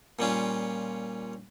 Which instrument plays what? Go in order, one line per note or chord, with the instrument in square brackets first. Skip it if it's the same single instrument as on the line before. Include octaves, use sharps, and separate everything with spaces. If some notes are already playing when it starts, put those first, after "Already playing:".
[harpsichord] A#2 G3 C#4 F4